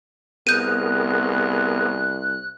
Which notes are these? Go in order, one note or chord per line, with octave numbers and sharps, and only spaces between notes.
C2 B3 G#4 A#4 F#6 G6 D#7